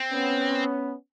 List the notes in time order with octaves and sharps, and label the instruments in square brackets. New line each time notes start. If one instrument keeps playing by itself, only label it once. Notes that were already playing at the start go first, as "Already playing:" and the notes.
Already playing: [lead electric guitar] C4
[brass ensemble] B3 C#4